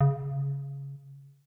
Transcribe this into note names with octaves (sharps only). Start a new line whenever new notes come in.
C#3